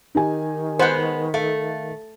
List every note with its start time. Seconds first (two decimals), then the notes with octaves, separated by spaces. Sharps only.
0.15 D#3 D#4 G4 G#5
0.79 G#3 B3 C5 F#5
1.34 A3 F5